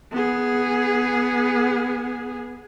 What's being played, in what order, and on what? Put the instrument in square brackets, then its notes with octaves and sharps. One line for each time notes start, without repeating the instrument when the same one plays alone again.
[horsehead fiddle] B3 G#4